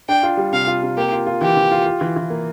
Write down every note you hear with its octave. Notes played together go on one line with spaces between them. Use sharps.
D4 G5
F4
G3
C3 F5
F4
C3
A#3 G4
F4
F4
E3 G4
E3
F4
F4
E3
E3
A#3